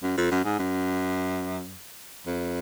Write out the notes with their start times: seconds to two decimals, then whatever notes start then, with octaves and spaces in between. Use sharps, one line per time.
0.03 F#2
0.17 F2
0.31 F#2
0.45 G#2
0.59 F#2
2.26 F2